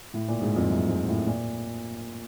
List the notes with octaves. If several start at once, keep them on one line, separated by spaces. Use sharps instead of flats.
A2
A#2
G#2
F2
F#2
G#2
A2
A#2